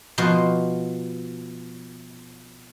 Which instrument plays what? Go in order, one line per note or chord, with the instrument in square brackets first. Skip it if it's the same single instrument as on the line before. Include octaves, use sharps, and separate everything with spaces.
[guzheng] B2 F3 F#4 C5 D#5 C6